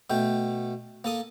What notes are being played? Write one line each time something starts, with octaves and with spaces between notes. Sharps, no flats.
B2 A3 G5
A#3 A4 D#6